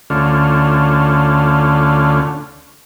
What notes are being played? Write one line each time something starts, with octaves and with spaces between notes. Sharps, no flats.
D2 D3 A3 C#4 F4